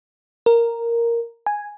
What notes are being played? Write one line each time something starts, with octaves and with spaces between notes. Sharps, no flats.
A#4
G#5